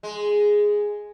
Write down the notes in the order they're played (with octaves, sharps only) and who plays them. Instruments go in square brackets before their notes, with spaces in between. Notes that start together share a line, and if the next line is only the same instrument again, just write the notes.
[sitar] G#3